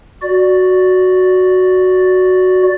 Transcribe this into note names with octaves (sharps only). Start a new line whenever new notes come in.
F#4 D5